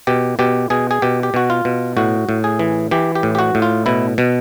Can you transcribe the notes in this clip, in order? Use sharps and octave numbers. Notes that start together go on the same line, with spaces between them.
B2 G4
B2 G4
B2 G#4
G#4
B2 G4
G4
B2 F#4
F4
B2
A2 F#4
A2
G#4
E3
E3 G4
G4
A2
G4
F#4
A2
F4
B2 E4
B2